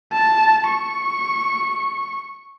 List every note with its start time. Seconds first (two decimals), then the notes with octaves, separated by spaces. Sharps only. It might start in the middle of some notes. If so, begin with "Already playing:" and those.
0.13 A5
0.68 C#6